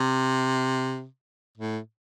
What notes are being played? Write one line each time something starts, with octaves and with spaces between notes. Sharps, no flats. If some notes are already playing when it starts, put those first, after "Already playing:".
Already playing: C3
A2